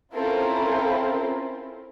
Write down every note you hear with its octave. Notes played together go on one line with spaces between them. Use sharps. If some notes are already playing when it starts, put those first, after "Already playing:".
C4 C#4 E4 F4 A4 A#4